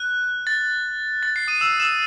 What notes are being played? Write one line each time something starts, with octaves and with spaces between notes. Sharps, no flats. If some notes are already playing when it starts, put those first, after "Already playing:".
Already playing: F#6
A6
A6
C7
D#6 D#7
E6 E7
E6 E7